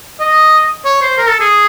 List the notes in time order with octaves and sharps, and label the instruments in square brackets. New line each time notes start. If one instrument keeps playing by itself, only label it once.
[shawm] D#5
C#5
C5
A#4
A4
G#4